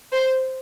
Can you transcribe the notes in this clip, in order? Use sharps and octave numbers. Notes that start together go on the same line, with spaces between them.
C5